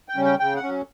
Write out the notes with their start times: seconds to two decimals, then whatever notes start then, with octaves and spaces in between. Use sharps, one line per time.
0.09 G5
0.16 C#3 G3 C#4
0.25 G5
0.39 C#3 G5
0.56 F#5
0.63 F#3 C#4